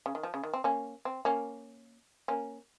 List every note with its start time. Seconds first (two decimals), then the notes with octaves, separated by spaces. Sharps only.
0.06 C#3
0.15 D#3
0.23 F3
0.34 C#3
0.43 D#3
0.53 C4
0.64 A#3 C#4
1.05 C4
1.25 A#3 C#4
2.28 A#3 C#4